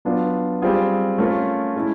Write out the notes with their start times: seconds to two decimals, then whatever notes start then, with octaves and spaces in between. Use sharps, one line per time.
0.05 F#3 B3 D4 F4
0.61 G3 C4 F4 G#4
1.18 A3 C#4 F4 A#4
1.75 G#3 C#4 E4